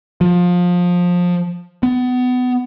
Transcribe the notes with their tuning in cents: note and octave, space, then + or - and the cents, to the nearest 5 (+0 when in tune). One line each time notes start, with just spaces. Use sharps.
F3 +20
B3 +25